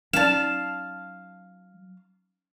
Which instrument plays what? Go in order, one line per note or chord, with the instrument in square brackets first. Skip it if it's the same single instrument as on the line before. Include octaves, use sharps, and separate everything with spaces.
[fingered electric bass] F#3 [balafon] C#4 D#4 D5 [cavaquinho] F5 A5 [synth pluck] E7